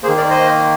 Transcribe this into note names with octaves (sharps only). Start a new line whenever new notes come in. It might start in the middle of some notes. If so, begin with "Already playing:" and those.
D#3 A#3 G#4 C5
A#4 D5
C5 D#5